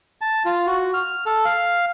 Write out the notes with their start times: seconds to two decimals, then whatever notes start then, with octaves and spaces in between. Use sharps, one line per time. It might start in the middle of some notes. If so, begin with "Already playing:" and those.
0.21 A5
0.45 F4
0.66 F#4
0.94 F6
1.26 A4
1.45 F5